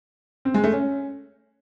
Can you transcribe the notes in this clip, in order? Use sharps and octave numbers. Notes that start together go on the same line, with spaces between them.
C4
G#3
A3
C#4